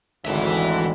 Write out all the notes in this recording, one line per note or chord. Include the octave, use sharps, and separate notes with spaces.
G#1 D2 E3 E5